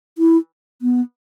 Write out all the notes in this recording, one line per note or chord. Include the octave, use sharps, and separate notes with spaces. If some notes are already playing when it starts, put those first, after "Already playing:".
E4
B3